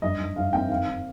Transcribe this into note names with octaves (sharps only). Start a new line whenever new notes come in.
G2 D#5
G2
G2 F5
C4 G5
D#3 F5
D#3